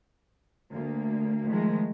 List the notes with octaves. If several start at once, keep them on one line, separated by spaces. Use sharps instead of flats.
D2 A#3
D#3 F3 G#3 A3